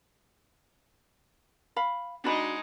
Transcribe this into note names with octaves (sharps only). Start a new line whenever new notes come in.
F5 B5
G#3 D4 D#4 F#4 B5